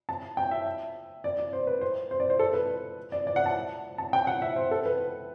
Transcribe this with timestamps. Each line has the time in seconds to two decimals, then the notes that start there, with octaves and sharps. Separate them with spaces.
0.09 A5
0.37 G5
0.51 E5
1.24 D5
1.39 D5
1.53 C5
1.67 B4
1.81 C5
2.11 C5
2.20 D5
2.30 C5
2.39 A4
2.53 B4
3.12 D5
3.27 D5
3.36 F#5
3.46 A5
3.98 A5
4.13 G5
4.27 F#5
4.42 E5
4.56 C5
4.71 A4
4.85 B4